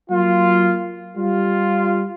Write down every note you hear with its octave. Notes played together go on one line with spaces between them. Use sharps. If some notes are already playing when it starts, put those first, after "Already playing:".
F#3 A#3 F4
G3 F4